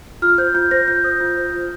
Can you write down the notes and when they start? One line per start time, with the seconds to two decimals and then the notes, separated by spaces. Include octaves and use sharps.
0.22 F4 F6
0.38 C5 G6
0.54 F4 G6
0.71 C5 A#6
0.87 F4 G6
1.04 C5 D#6
1.20 F4
1.37 C5
1.53 F4